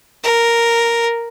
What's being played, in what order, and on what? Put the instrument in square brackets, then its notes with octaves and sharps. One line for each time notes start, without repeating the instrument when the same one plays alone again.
[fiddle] A#4